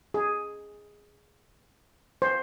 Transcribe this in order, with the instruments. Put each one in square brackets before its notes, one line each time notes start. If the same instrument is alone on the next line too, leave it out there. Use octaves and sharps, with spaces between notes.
[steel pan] G#4
C5